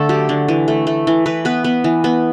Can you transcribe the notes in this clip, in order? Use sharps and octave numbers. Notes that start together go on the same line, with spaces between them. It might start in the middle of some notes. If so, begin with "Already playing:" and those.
Already playing: D3 A3 A4
F#3 G4
D3
E3
A3
A3
E3
E3 B4
B3 B4
B3
E3
B3